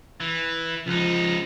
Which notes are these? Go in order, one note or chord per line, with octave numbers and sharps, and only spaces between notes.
E3
C#2 F3 D#4